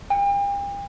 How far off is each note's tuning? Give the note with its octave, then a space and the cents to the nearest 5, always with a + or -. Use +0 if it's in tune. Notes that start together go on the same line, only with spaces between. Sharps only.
G5 +40